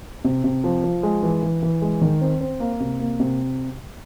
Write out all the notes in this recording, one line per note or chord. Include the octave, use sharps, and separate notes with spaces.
C3
C3
F3
F3
G#3
E3
E3
E3
G#3
D#3
C4
C4
A#3
C3
A#3
C3